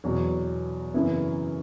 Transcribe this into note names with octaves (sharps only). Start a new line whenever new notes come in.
E2 B2 F#3
F#2 C#3 E3 B3 E4